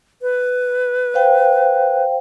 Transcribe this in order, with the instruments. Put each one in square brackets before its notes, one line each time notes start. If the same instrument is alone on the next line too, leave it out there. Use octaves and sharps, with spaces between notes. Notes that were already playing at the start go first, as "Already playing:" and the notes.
[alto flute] B4
[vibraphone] C5 F5 G5